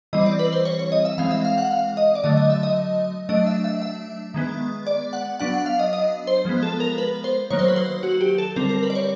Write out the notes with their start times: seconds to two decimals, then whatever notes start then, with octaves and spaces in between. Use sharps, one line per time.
0.13 E3 G3 C4 D#5
0.26 D5
0.39 B4
0.52 C5
0.65 C#5
0.79 C#5
0.92 D#5
1.05 E5
1.18 E3 G#3 C4 F5
1.31 E5
1.45 F5
1.58 F#5
1.71 F5
1.97 D#5
2.15 D5
2.24 D3 F#3 A3 D#5
2.37 D#5
2.50 E5
2.63 D#5
3.29 F#3 A3 D4 D#5
3.47 E5
3.64 E5
3.82 E5
4.34 D#3 G#3 B3
4.87 D5
5.13 F#5
5.40 F#3 B3 D4 F#5
5.54 F#5
5.66 F5
5.79 D#5
5.93 D#5
6.27 C5
6.45 F3 G#3 B3
6.63 A4
6.80 A#4
6.98 B4
7.24 C5
7.50 D#3 F#3 A#3 C#5
7.59 C5
7.68 B4
7.76 C5
8.03 F#4
8.21 G4
8.38 A4
8.56 D3 G3 C4 A#4
8.69 A#4
8.83 B4
8.90 D5
8.95 C#5